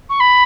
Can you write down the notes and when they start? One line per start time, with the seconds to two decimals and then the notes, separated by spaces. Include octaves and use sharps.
0.09 C#6
0.20 B5